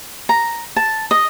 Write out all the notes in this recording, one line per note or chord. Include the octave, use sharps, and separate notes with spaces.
A#5
A5
D#5